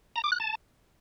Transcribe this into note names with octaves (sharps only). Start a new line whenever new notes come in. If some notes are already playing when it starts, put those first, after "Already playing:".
A#5
D6
F#6
A5